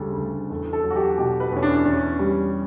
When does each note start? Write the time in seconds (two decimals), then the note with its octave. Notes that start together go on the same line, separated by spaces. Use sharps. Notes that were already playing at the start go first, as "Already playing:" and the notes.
Already playing: D2 C#3 G3 G4 A4
0.17 D2
0.50 E2 A4
0.73 A4
0.84 F#3
0.90 F#4
0.96 G4
1.18 B2 G4
1.40 B4
1.52 E2 C#4
1.62 D4
1.85 E2 C#4
2.19 G3